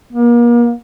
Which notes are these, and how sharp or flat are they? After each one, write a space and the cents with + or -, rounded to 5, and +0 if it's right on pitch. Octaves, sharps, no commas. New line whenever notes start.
A#3 +35